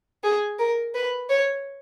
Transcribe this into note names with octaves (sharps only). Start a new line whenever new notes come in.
G#4
A#4
B4
C#5